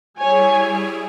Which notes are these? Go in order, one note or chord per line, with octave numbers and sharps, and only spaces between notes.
G3 E4 G#4 C#5 G#5